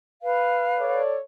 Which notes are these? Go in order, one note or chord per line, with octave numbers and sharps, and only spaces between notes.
B4 F5
A4 C#5 D5